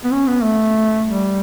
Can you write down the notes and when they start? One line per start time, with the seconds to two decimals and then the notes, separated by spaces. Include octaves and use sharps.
0.04 B3
0.12 C#4
0.27 B3
0.43 A3
1.06 G3